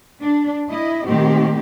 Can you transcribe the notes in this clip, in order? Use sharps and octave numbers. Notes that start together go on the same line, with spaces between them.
D4
E4 D#5
A#2 D#3 A3 C4 G4